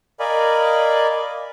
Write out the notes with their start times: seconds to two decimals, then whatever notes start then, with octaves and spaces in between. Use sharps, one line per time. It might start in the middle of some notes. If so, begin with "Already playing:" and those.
0.20 A#4 D5 D#5 F5 G#5 B5